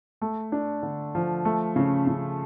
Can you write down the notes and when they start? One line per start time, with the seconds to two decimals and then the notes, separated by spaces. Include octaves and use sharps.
0.21 A3
0.52 D4
0.83 D3
1.15 F3
1.45 A3
1.76 C#3
2.07 C#3